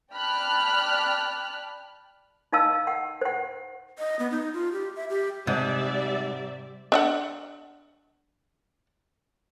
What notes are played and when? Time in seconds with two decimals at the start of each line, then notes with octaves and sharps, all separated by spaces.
0.12 D5 G5 A5 B5 F6 F#6
2.52 D#4 D#5 F5 A5 E6
2.87 F#5
3.21 C5 F#5
3.99 D#5
4.19 B3
4.31 D#4
4.54 F4
4.72 G4
4.96 E5
5.10 G4
5.47 G#2 C3 G3 D5 E5 D#7
6.92 D4 E5 F#5